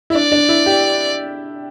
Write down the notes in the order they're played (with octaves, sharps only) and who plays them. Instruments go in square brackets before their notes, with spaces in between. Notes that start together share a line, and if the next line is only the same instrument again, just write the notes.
[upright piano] E4
[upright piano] D4 [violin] D5
[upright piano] D4
E4
G4